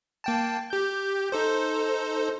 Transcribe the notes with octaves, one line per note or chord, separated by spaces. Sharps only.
A#3 G5 A5
G4 G6
D#4 A4 C5